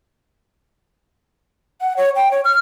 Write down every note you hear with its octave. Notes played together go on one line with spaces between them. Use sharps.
F#5
C#5
G5
C#5
F6